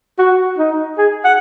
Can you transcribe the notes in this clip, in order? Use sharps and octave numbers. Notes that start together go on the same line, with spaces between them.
F#4
D#4
G#4
F#5